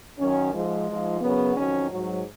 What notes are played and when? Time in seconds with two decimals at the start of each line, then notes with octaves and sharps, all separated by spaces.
0.19 F#2 D#3 F#3 C#4
0.53 G#2 F3 G#3
0.88 G#2 F3
1.21 F#2 C#3 F#3 B3
1.56 F2 D#3 F#3 C#4
1.90 G#2 F#3